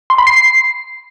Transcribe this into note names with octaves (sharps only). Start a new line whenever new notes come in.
C6
B5
C7